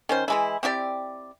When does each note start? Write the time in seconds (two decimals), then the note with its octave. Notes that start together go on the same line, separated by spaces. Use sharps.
0.09 D#3 C#4 C5
0.28 E3 G#3 E4
0.63 C4 E4 G4 D5